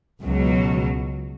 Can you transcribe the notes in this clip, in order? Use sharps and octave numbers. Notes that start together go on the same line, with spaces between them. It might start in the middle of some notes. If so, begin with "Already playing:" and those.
C#2 B2 F#3